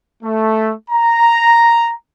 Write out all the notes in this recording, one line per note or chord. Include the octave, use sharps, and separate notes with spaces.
A3
A#5